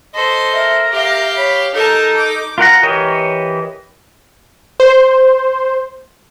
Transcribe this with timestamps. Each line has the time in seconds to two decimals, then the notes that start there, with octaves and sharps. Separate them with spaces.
0.14 A4 C5 D#5
0.54 A#4 E5
0.92 G4 E5 F5
1.37 C#5 B5
1.75 D#4 A4 A#4 A5
2.17 D6
2.58 F4 A#4 F#5 A#5
2.83 E3 G4 A#4 C#5 D#5
4.80 C5